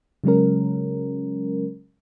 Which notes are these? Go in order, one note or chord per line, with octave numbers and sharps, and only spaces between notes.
C#3 F#3 G#3 C#4 A#4